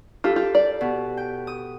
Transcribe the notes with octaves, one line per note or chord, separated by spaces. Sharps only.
E4 F4 G4 A4
F4 G5
D5
B2
G5
D#6